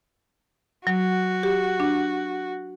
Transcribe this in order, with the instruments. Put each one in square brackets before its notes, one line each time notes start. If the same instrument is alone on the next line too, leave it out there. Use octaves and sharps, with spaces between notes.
[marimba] F#3 [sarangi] F#4
[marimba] G4
D4